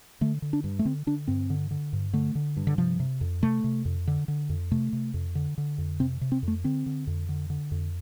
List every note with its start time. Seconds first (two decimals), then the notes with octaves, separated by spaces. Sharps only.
0.21 D3 A3
0.42 D3
0.53 D4
0.64 G2
0.79 A3
0.85 D3 C4
1.07 D3 D4
1.28 G2 C4
1.50 D3
1.71 D3
1.93 G2
2.13 D3 A3
2.35 D3
2.57 G2
2.67 D3
2.78 C3 F3
3.00 C3
3.21 F2
3.42 C3 A3
3.64 C3
3.85 F2
4.07 D3
4.28 D3
4.49 F2
4.71 C3 A3
4.93 C3
5.14 F2
5.35 D3
5.58 D3
5.78 F2
6.00 C3 C4
6.21 C3
6.32 C4
6.43 F2
6.48 A3
6.64 D3 C4
6.86 D3
7.07 F2
7.29 D3
7.50 D3
7.71 F2